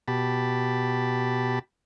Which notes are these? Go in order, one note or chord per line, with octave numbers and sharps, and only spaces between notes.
B2 G4 A5 B5